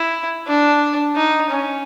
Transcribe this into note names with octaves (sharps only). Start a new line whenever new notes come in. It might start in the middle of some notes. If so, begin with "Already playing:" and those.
Already playing: E4
D4
D#4
C#4